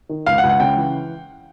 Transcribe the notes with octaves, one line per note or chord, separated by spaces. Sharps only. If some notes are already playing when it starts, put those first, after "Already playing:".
D#3
C#2 F5
F#5
C#2
F#5
C#3 G5
E3